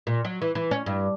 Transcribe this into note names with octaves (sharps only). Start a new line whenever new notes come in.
A#2
F#3
E3
E3
C#4
G2